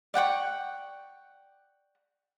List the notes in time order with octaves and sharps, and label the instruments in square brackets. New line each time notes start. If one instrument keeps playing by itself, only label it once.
[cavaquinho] D5 F#5 G5 C#6